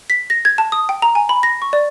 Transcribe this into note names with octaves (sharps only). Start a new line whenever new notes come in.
B6
A#6
G#6
A5
D#6
G5
A#5
G#5
B5
A#6
C#6
D5